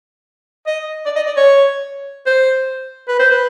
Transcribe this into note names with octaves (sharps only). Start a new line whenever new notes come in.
D#5
D5
D#5
D5
C#5
C5
B4
C5
B4